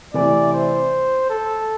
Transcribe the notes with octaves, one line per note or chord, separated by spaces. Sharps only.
C3 E3 A3 D5
C5
A4